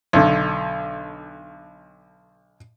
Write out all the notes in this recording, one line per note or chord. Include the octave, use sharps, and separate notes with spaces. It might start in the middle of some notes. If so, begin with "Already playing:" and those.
B1 D3